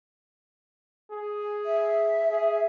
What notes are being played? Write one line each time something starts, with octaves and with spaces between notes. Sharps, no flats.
G#4
E5
G#4